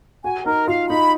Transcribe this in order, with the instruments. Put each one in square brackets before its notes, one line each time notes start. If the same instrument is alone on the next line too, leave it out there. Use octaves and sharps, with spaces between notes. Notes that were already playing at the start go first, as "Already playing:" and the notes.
[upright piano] F#4 [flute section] G#5
[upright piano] D#4 [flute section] A#4
[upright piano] F4 [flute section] F5
[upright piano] D#4 [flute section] B5